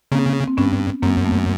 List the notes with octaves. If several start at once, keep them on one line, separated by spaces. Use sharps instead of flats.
C#3 A#3 C4
C4
G2 B3 C#4
F#2 A#3 C4
A3 B3